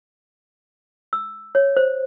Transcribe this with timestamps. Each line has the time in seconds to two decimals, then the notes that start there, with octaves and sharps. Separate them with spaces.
1.13 E6
1.55 C#5
1.77 C5